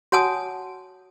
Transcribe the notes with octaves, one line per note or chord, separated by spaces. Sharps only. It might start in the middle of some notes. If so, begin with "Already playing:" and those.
F#4 C#5 F#5 G#5 A5 D#6